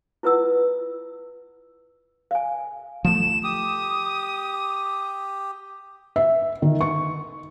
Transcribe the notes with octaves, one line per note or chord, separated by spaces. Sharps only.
E4 F4 B4 F#5 E6
F5 G#5
F3 A3 E7
G4 D#6
E5
D#3
C#6